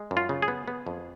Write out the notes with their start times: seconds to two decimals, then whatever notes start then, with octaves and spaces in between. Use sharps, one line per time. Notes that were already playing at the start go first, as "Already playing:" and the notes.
Already playing: G#3
0.11 F#2
0.17 F4
0.29 C#3
0.42 G#4
0.48 B3
0.68 B3
0.87 F2